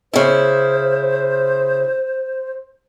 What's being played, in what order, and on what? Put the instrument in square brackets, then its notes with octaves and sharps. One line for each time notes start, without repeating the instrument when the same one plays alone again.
[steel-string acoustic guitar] C#3 E4 [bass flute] C5